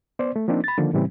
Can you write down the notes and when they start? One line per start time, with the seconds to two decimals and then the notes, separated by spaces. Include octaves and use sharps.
0.19 B3 C5 D5
0.36 A3
0.48 F3 A#3 C4 D4 D#4
0.64 B5 A6
0.78 D3 D#3 F3 A#3
0.93 A2 C#3 E3 G3 C4